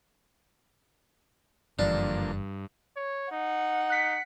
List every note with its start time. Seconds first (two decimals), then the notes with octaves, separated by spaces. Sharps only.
1.79 F#1 G2 D3 E3 F3 A#3 D4
2.96 C#5
3.31 D#4 F#5
3.90 F#6 B6 C#7